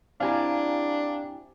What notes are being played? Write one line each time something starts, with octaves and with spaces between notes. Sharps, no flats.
C4 D4 E4 G4 F5 G#5 A#5